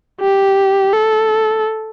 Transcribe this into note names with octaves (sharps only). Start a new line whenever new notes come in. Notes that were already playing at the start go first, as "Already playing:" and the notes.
G4
A4